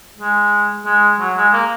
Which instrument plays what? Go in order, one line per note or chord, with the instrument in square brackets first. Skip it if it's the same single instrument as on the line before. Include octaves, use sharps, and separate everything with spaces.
[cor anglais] G#3
G#3
F#3
G#3
A#3